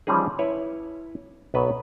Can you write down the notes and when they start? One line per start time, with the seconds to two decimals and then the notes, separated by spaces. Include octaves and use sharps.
0.07 E3 F3 G3 C#4 D#4 G#4
0.39 E4 B4 C#5
1.54 B1 F#3 B3 B4 E5